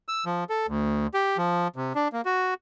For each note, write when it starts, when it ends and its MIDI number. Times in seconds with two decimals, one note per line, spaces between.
0.08 0.25 88
0.26 0.44 53
0.50 0.67 69
0.68 1.07 38
1.14 1.37 67
1.38 1.68 53
1.76 1.93 48
1.95 2.08 62
2.13 2.21 58
2.26 2.54 66